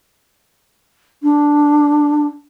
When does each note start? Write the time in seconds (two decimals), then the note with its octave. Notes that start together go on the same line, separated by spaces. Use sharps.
1.22 D4